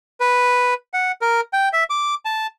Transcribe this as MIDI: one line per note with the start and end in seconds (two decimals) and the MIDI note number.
0.20 0.74 71
0.94 1.12 78
1.22 1.41 70
1.53 1.69 79
1.73 1.84 76
1.90 2.15 86
2.25 2.47 81